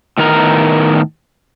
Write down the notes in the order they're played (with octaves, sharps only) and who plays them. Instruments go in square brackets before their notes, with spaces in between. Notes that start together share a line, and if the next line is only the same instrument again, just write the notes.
[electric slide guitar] A2 D#3 B3 A#4 A#5